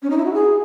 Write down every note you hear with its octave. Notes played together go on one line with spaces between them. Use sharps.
C#4
D#4
E4
F#4
G#4